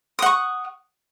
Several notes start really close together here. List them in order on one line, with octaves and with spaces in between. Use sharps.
D#6 F#5 C#6